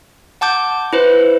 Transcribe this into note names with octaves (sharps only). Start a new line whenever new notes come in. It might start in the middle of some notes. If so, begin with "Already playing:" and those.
F#5 A5 D6 G6
E4 B4 C5